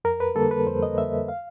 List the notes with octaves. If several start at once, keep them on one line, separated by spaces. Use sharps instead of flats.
F2 A#4
B4
D3 G3 A#3 A4
B4
F2 C5
D#5
D3 G3 A#3 E5
F5